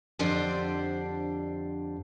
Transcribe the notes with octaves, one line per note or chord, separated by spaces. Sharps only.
F2 D3 D4 G4 C5 D5